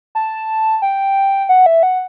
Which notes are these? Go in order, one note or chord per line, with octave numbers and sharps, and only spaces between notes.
A5
G5
F#5
E5
F#5